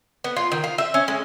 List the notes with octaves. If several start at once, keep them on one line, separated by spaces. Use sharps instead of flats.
B3
F4
D#3
F4
E5
C#4
G#3